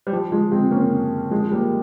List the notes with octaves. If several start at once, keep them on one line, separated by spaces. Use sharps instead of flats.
G3
F3
F3 G#3
G#3 C4
A#3 C#4
F3 G#3
G3 A#3